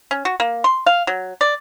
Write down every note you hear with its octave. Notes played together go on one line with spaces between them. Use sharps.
C#4
F#4
A#3
C6
F5
F#3
D5